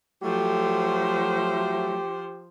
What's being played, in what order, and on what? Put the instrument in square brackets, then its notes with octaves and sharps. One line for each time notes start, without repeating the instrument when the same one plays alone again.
[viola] F3 C5 [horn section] F#3 A3 [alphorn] G4